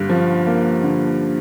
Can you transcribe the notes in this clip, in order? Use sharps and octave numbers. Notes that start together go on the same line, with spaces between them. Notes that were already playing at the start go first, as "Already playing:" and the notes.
Already playing: G2 D3
F3
A#3
D3